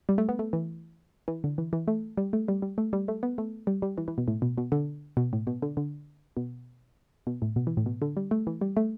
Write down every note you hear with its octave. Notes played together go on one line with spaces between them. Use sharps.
G3
A3
B3
A3
E3
E3
D3
E3
E3
A3
G3
A3
G3
G3
A3
G3
A3
B3
A3
G3
G3
E3
E3
B2
A2
B2
B2
D3
B2
A2
B2
D3
D3
B2
B2
A2
B2
E3
A2
B2
D3
G3
A3
E3
G3
A3